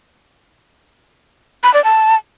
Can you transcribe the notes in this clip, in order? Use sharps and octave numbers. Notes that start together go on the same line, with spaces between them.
B5
D5
A5